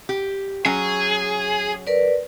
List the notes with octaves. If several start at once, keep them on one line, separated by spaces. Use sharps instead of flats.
G4
F#3 C#4 G#4
A#4 B4 D5